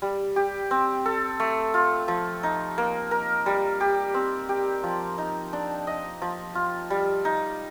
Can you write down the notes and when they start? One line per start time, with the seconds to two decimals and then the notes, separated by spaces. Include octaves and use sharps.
0.02 G3
0.36 G4
0.71 C4
1.06 A4
1.40 A3
1.74 F4
2.08 F3
2.43 D#4
2.78 A#3
3.11 A#4
3.46 G3
3.80 G4
4.14 C4
4.49 G4
4.84 F3
5.18 D#4
5.53 D4
5.87 D#5
6.22 F3
6.55 F4
6.90 G3
7.25 D#4